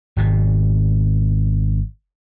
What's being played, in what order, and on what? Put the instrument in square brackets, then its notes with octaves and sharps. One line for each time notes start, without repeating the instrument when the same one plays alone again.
[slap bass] G#1 B2